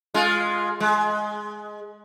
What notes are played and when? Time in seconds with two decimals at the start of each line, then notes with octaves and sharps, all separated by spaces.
0.14 G#3 F4
0.80 G#3